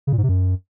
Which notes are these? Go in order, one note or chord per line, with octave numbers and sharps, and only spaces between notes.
C#3
A#2
G#2
C3
F#2